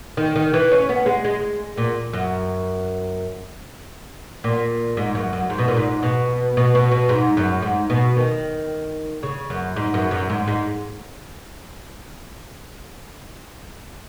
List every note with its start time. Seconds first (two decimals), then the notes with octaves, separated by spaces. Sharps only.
0.17 D#3
0.36 D#3
0.53 E3
0.71 C#4
0.89 B3
1.06 G#3
1.25 G#3
1.77 A#2
2.13 F#2
4.44 A#2
4.97 G#2
5.15 F#2
5.33 F#2
5.50 G#2
5.59 B2
5.68 A#2
5.76 G#2
6.03 B2
6.57 B2
6.75 B2
6.92 B2
7.09 G#2
7.37 F#2
7.62 G#2
7.90 B2
8.17 D#3
9.23 C#3
9.50 F#2
9.76 G#2
9.94 F#2
10.11 F#2
10.30 G#2
10.47 G#2